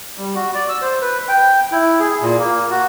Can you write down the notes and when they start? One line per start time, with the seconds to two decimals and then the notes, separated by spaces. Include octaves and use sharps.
0.18 G3
0.35 F#4
0.55 D5
0.69 E6
0.82 C5
1.01 B4
1.28 G5
1.72 E4
2.00 G#4
2.21 A#2
2.38 A#3
2.71 F#4